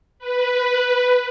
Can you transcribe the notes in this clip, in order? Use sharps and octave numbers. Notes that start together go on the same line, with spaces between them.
B4